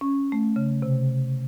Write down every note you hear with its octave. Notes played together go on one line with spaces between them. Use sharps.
C#4
A3
C#3
C3